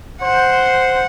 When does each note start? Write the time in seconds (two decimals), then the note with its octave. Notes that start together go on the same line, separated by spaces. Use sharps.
0.22 C5 F#5